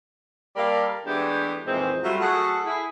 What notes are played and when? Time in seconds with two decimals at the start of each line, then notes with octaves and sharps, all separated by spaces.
0.56 G3 A#3 A4 A#4 D5 F5
1.06 E3 G#3 A3 B3 D4 G4
1.66 F2 A#2 D#3 E3 G#3 C4
2.03 F#3 G3 A3 E4 F4
2.21 F#3 A3 G#4 A4 F#5
2.65 E4 G#4